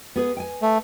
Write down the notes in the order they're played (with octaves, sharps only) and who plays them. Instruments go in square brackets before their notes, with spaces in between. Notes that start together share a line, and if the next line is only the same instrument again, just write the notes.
[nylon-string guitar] B3 G#4 B4
G5 G#5
[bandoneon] A3